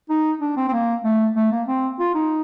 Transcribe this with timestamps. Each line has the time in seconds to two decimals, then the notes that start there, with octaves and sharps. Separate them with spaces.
0.10 D#4
0.41 D4
0.56 C4
0.68 C4
0.73 A#3
1.04 A3
1.36 A3
1.52 A#3
1.67 C4
1.99 F4
2.15 D#4